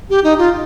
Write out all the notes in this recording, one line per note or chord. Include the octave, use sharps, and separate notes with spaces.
G4
D#4
F4